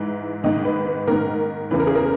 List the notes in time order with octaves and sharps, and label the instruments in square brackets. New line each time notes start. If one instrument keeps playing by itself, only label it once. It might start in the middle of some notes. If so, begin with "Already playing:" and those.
Already playing: [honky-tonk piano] G#2 E3
G#2 D#3 D#5
B4
B4
G#2 D#3 A#4
E2 C#3 E3 B4
A#4
G#4
A#4